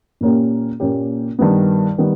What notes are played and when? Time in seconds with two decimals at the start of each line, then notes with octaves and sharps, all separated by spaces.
0.21 A#2 A#3 C#4 G4
0.80 A#2 A#3 C#4 G4
1.39 G2 D#3 G3 B3
1.98 D#3 G3 B3